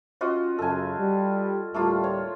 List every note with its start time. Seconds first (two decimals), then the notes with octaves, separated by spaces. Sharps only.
0.21 C#4 F4 F#4 D#5
0.59 F#2 C#3 A4 G#5
0.98 G3
1.74 D2 A2 G3 A3 A#3 F4
2.04 C#5